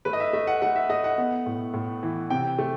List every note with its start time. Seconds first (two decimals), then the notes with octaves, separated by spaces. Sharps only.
0.05 A3 B4
0.13 D#5
0.20 E5
0.33 A3 E5
0.47 F#5
0.62 A3 F#5
0.76 E5
0.90 A3 D#5
1.04 F#5
1.18 B3
1.46 A2
1.74 A2
2.03 E3
2.30 C3 G5
2.58 A3